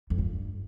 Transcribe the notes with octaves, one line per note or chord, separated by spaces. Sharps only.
F2
G2